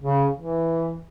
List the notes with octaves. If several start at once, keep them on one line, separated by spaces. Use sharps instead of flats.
C#3
E3